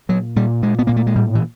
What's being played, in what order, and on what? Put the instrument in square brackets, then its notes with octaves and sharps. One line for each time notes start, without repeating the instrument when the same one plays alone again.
[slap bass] A#2 F#3
A#2 G3
A#2 G#3
B3
A#2 A#3
A3
G#3
A2 G3
E3